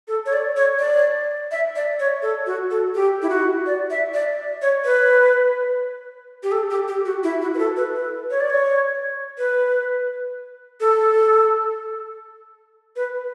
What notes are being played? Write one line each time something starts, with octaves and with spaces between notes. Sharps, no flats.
A4
C#5
D5
C#5
D5
E5
D5
C#5
A4
F#4
A4
G4
E4
F#4
D5
E5
D5
C#5
B4
G4
A4
G4
G4
F#4
E4
F#4
B4
A4
B4
B4
C#5
D5
C#5
B4
A4
B4